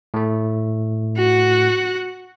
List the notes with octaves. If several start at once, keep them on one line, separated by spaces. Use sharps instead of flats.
A2 A3
F#4 F#5